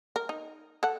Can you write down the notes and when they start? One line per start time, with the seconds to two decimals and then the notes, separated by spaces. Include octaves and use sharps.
0.16 A#4
0.29 D#4
0.83 A4 F#5